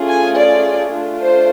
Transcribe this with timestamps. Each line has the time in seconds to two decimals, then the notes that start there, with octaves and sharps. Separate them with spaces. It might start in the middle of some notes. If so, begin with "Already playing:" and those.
Already playing: A3 C#4 F4 G#4
0.09 G#5
0.37 D5
0.93 A3 D4 F4
1.21 C5